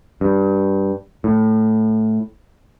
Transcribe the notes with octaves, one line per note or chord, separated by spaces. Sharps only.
G2
A2